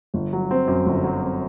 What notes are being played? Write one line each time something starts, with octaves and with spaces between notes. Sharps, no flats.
G1
F#3
C4
F#2
G1
F#3
C4